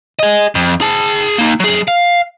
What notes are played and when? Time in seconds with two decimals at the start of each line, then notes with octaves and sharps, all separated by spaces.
0.19 G#4 D#5
0.55 F2
0.81 G#4 A5
1.38 A#3 D#4
1.60 F#3 G#4
1.88 F5